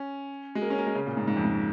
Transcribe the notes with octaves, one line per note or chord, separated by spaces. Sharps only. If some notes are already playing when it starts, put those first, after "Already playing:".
Already playing: C#4
G#3
A#3
C#4
A#3
G#3
C#3
A#2
G#2
G#2
F2
G#2